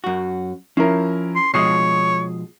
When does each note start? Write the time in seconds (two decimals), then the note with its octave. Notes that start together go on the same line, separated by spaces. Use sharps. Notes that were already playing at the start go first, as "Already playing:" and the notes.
0.04 F#2 F#4
0.77 F3 C#4 E4 A#4
1.36 C6
1.54 B2 F3 G#3 C#5 D#6 C7